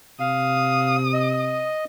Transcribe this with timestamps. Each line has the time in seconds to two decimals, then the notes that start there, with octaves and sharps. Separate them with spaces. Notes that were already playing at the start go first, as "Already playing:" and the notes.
0.20 C3 F5 D#6
1.13 D#5